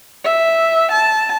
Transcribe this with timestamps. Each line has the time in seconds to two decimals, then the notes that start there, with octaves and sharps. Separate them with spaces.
0.24 E5
0.92 A5